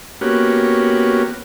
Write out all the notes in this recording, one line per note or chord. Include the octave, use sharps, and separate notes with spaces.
A#3 B3 C#4 F#4 G4